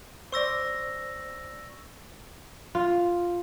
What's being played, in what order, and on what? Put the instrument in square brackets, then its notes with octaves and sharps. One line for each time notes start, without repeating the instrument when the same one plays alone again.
[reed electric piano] C5 D5 [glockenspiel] C#6 E6 A#6
[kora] F4